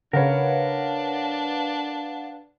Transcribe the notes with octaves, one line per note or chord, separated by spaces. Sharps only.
C#3 D4 A#4 B4 C#5 F5 F#5